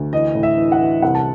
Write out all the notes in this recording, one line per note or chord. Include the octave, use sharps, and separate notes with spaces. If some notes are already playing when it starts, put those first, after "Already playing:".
Already playing: D2
E3 D#5
A2
E5
E3
F#5
E3
C2 F#5
A5